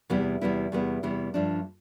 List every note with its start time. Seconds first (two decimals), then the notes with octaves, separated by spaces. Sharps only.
0.10 E2 C3 G3 B3 E4
0.41 E2 C3 G3 B3 E4
0.72 E2 C3 G3 B3 E4
1.03 E2 C3 G3 B3 E4
1.34 G2 F3 A3 D4